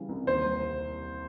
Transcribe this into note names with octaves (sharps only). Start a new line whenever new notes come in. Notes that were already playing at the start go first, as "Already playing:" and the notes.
Already playing: C#3 E3 G3
C2
D#2 C5
G3